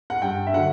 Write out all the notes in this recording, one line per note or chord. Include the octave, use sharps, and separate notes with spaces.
F#5
G2 G5
E5
D3 F#3 F#5